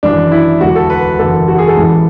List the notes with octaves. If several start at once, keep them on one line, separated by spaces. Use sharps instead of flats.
G#1 F#2 E3 D4
E4
E1 D2 D3 F#4
A4
B4
F#1 E2 D3 F#3 A4
F#4
G#4
A4
A1 G#2 E3